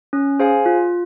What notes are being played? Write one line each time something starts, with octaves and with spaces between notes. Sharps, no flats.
C#4
G#4 C5 F5 G#5
F4